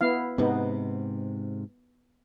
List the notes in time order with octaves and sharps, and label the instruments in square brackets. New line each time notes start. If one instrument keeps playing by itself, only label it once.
[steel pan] B3 E4 F5
[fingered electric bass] G#2 C3 [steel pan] B3 D#4